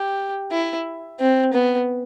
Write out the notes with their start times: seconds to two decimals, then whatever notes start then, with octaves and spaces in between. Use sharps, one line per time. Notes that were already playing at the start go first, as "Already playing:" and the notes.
Already playing: G4
0.52 E4
1.20 C4
1.53 B3